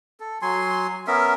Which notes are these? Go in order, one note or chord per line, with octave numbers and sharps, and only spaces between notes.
A4
F#3 G#5 C6
B3 C#4 A#4 E5